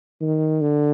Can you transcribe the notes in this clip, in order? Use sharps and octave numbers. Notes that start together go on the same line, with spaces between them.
D#3
D3